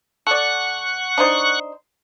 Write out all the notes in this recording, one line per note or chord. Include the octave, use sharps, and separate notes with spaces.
A4 D5 F#5 C#6 F#6
D4 D#4 C5